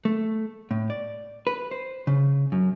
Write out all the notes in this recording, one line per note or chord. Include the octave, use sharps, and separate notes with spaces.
A3
A2
D5
B4
C5
C#3
F#2